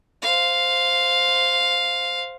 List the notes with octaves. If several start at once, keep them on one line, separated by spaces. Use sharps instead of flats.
C5 F5